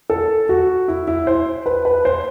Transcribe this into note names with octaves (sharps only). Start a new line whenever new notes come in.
A4
F#4
E4
E4
C5
B4
B4
C5